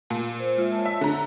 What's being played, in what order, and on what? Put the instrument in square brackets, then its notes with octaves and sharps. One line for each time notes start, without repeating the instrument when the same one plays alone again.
[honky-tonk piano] A#2
[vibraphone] C5
G#3 F4 E5
C#5 A5
[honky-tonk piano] E5
D3 A#5